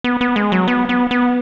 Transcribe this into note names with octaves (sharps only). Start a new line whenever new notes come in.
B3
B3
G#3
F#3
B3
B3
B3